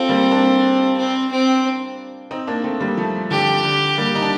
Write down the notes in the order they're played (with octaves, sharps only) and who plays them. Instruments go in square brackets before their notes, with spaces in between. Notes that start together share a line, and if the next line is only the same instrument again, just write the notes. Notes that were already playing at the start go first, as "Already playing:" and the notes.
Already playing: [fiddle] C4 [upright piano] F4 A4
[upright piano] G3 A#3
A#3 D4
[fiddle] C4
C4
[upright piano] C4 D#4
A#3 D4
A3 C4
G3 A#3
F3 A3
[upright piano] D3 F3 [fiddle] G4
[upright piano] D3
G3 A#3
D#4
D4